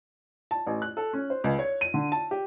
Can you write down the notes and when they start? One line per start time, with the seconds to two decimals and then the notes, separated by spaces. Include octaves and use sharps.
0.51 A5
0.67 A1
0.82 F#6
0.97 A4
1.13 C#4
1.30 C5
1.44 C#2
1.59 C#5
1.81 D#7
1.94 D3
2.12 A5
2.31 G4